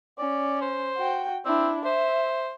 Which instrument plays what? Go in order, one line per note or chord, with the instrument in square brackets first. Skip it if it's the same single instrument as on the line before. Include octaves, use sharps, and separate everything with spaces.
[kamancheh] C#4 [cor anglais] D5
[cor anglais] C5
[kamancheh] F#4 G5
[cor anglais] C4 [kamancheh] D4 E4
[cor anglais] C5 [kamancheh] E5